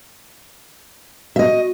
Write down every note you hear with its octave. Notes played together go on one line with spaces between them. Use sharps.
F#4 D#5 E5